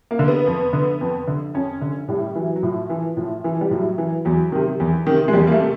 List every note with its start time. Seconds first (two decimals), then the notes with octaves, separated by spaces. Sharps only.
0.11 A#3
0.19 D3
0.28 B3
0.47 F2
0.73 D3
1.01 F2
1.28 D3
1.54 F2 C#4
1.81 D3
2.08 A2 G3
2.35 E3 F#3
2.56 F#3
2.63 A2 F3
2.90 E3
3.17 A2 F3
3.44 E3
3.61 G3
3.71 A2 F#3
3.98 E3
4.25 E2 F#3
4.52 C3 D#3
4.80 E2
5.07 C3 D#3
5.28 G#3
5.33 E2 G3
5.47 A#3
5.52 A3
5.61 C3